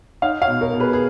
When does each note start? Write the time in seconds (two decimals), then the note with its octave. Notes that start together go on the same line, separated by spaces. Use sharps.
0.22 D#4 C#5 F5
0.42 C#5 F5
0.48 B2
0.61 A#4 C#5
0.74 B2
0.80 G#4 B4
0.93 G#4